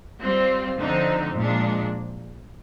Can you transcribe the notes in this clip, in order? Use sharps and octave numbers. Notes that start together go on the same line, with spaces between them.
G3 C4 F4
D3 F3 C4 D#4
A#2 F3 G#3 D4